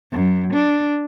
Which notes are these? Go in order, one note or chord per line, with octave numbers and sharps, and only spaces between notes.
F#2
D4